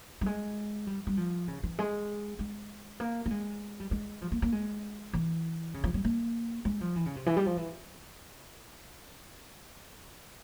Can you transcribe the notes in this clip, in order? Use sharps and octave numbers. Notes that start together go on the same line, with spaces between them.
G3
G#3
G3
G3
F3
C#3
E3
G#3
G#3
A#3
A#3
G#3
G3
G#3
F3
A#3
A#3
G#3
E3
C#3
F3
G3
A#3
G#3
F3
E3
C#3
C3
E3
G3
F3
E3